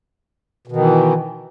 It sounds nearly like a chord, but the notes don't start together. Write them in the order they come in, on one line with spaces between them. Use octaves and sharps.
B2 D#3 E3